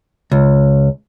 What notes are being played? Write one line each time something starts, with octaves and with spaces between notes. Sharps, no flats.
C#2